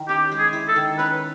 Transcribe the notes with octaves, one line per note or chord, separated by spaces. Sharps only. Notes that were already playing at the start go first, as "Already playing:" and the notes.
Already playing: D#3 E4
C#4 G4
G#3
G#4
E4
A4
D#3
C#4 B4